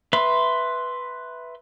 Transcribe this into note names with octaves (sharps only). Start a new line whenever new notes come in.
B4 E5 B5 C6